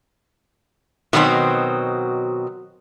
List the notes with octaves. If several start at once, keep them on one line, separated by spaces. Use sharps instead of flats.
B2 D#3 F#3 B3 C4